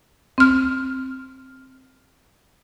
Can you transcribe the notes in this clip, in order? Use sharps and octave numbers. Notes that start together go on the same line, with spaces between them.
C4 F6